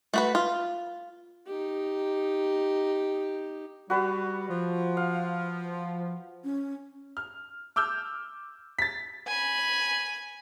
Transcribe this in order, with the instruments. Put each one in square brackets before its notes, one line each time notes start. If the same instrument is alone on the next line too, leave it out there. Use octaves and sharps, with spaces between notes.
[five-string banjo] A3 F#4 B4
F4
[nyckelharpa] D#4 G4
[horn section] G3 [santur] F#4 B4
[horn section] F3
[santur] F5
[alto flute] C#4
[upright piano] F6
D6 E6 F6 G6
A6 B6
[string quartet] G#5 B5